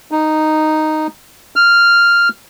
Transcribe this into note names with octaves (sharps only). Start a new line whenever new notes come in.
D#4
F6